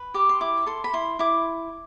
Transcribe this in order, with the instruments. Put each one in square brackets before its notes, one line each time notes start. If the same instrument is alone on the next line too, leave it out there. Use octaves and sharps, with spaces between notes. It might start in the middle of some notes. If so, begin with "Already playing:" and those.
Already playing: [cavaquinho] B4
G4 D6
C6
E4 D6
A4 C6
B5
E4 C6
E4 D6